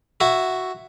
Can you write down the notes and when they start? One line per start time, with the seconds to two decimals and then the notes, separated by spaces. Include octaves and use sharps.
0.20 E4 F#4